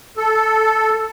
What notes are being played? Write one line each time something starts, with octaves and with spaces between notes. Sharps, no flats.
A4